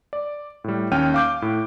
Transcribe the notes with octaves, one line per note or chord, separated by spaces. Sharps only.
D5
A2 G3
D#2 C#4 G5 F6 D#7
F5 D6 G6
A2